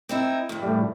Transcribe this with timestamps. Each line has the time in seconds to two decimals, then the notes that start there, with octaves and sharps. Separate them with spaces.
0.09 C4 D#4 E4
0.49 E2 G2
0.62 A2 G3